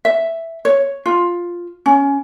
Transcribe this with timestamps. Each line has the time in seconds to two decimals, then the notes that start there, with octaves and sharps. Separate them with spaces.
0.05 E5
0.65 C#5
1.06 F4
1.86 C#4